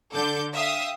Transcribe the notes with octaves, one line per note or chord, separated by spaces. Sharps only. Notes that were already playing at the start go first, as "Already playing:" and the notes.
D3 A4 D6 G6
E5 F5 G5 D#6